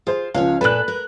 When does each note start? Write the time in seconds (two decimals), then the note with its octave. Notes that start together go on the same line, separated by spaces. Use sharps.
0.07 F4 G#4 C5
0.34 C#2 F3 C#4 C#5 F5
0.61 A#2 A3 A4 B4 F#6
0.88 A#4